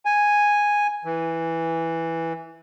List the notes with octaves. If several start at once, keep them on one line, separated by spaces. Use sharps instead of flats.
G#5
E3